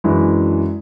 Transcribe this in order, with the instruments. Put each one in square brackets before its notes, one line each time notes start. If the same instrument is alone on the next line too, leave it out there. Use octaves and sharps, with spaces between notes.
[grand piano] F#2 E3 G#3 D4